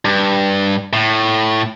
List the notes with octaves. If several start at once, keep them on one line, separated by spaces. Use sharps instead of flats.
G2
A2